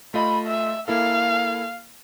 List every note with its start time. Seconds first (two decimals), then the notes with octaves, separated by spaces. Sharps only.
0.14 A3 F4 D#5 B5
0.47 E5
0.88 A#3 E4 A4 F5